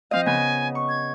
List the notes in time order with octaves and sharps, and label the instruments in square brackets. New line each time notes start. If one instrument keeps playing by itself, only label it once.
[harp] F3 C4 D#5 [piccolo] F5
[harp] C#3 B3 [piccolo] G#5
[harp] C#6
[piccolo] G#6